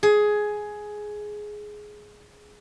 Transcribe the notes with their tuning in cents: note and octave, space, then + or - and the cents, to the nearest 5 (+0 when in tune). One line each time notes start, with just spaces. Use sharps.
G#4 +10